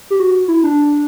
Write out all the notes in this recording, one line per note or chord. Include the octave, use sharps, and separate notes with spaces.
G4
F#4
E4
D4